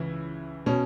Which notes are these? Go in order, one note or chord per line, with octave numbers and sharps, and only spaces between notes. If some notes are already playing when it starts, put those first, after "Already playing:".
Already playing: C#2 C#3 E3 E4
B2 C#4